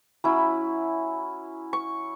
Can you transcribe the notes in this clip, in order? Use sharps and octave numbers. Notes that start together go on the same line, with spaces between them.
F#3 C#4 E4 B5
C#6